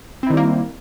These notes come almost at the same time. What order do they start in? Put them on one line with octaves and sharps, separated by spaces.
C4 E4 D#3 G3 A#3